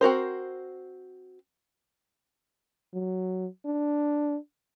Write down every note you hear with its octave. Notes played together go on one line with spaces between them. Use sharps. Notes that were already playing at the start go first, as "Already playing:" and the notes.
C4 F#4 A#4 C5
F#3
D4